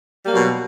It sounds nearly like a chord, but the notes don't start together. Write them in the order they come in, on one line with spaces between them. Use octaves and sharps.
G3 A#3 F#3 B2